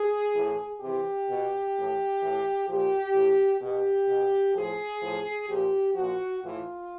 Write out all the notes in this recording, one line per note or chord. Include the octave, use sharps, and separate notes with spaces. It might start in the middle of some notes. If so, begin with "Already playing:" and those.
Already playing: G#4
A2 E3
C3 E3 G4
B2
A2 E3
A2 E3
A#2 F3 G4
A2 E3
B2 G4
B2
A2 F3 G#4
A2 F3
A#2 F3 G4
A#2 F3 F#4
A2 E3 F4